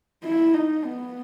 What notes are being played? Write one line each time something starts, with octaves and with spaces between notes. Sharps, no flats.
E4
D#4
B3